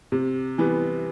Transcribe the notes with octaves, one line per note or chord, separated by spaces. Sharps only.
C3
E3 G3 B3